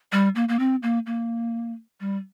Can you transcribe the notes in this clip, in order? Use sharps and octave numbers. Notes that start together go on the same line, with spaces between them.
G3
A#3
A#3
C4
A#3
A#3
G3